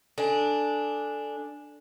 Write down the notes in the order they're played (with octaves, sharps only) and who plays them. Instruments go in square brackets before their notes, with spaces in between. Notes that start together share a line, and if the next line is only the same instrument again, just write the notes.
[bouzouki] D4 [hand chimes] A4 G#5